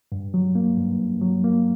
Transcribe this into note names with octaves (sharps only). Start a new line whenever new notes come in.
G2
F#3
A#3
G2
G2
F#3
A#3